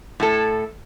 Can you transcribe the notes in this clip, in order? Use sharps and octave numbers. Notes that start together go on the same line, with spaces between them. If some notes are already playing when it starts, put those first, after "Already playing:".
A2 E4 A4